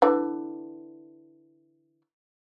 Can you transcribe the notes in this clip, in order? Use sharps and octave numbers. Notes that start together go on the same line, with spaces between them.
D3 E3